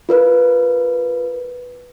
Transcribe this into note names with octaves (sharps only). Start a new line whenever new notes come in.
F4 A#4 B4